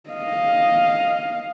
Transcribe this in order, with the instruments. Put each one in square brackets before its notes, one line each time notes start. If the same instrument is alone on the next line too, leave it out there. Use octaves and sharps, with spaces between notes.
[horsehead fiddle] D#5 F5